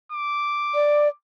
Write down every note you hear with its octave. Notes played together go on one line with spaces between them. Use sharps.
D6
D5